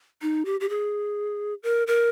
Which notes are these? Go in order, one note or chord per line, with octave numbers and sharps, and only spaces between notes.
D#4
G4
G4
G#4
A#4
A#4